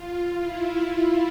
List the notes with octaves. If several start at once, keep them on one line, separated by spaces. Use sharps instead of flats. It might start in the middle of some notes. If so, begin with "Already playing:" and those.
Already playing: F4
E4